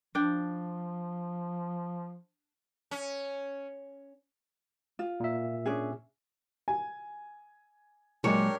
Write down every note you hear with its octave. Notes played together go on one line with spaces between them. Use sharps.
F3 D4 G5
C#4
F4
A#2 E5
C#4 D4 G#4
G#5
A#2 F#3 G#3 D4 G4 A#4 C#5